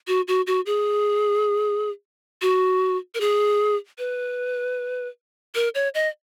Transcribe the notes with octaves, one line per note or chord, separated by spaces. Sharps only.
F#4
F#4
F#4
G#4
F#4
A#4
G#4
B4
A#4
C#5
D#5